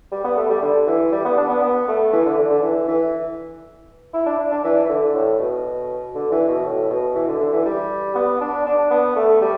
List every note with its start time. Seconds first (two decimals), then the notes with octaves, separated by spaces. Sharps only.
0.12 G3
0.24 B3
0.37 A3
0.49 G3
0.62 D3
0.87 E3
1.12 G3
1.25 B3
1.37 D4
1.49 B3
1.62 B3
1.88 A3
2.12 E3
2.26 D3
2.37 D3
2.50 D3
2.63 E3
2.88 E3
4.13 E4
4.26 D4
4.51 D4
4.64 E3
4.84 E3
4.89 D3
5.14 A2
5.39 B2
6.14 D3
6.31 E3
6.48 B2
6.64 A2
6.90 B2
7.15 E3
7.28 D3
7.40 D3
7.52 E3
7.65 G3
8.15 B3
8.41 D4
8.66 D4
8.90 B3
9.16 A3
9.41 G3